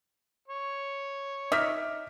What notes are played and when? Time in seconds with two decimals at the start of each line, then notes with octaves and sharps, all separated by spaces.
0.48 C#5
1.52 D#4 D#5 E5 D6 F6 B6